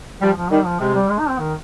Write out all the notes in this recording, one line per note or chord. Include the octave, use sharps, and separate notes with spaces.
F3 G3
F3
D#3 G3
F3
C3 G#3
G3
G#3
D#4
C4
D#3